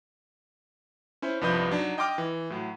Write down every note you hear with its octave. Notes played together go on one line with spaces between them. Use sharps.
C#4 E4 C5
C2 G2 F3 B4 D#5 G6
F#3 D4 D#4
D#5 G5 C6 D6 F6
E3
A2 F#3